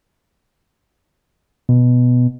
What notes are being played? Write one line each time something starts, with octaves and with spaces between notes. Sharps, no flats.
B2